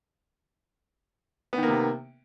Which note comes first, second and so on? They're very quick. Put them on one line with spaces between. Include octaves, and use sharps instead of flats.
B3 D#3 A#3 C3